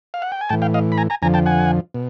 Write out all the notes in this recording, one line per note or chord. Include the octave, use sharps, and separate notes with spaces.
F5
F#5
G5
G#5
A2 E3 G5 A5
F5 G5
D#5 F5
B5
G#5 A#5
G#5 A#5
F2 D3 F3 G#5 A#5
G5 A5
F#5 G#5
B2